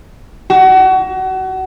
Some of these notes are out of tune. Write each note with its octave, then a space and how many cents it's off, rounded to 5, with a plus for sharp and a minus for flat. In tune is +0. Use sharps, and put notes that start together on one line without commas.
F#4 +30